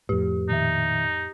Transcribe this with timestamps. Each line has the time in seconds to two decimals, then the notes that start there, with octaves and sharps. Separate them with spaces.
0.09 F2 A2 G4
0.49 A#2 D#3 D#4 E5